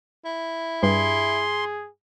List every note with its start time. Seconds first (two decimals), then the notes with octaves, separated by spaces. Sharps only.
0.25 E4
0.83 G2 G#4 C6